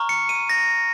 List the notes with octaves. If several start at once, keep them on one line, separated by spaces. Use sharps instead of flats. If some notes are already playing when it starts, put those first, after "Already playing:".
Already playing: A#5 C#6 F6
C#7
D#7
A#6